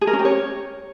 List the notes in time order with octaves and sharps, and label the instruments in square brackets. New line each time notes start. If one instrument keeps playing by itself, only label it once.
[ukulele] G#4
A#4
C#4
G4
C#5